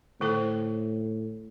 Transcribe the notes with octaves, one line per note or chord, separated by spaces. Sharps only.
A2 D3 A3 E4 A4 C5